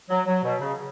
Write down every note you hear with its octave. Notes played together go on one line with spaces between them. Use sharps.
F#3
F#3
B2
C#3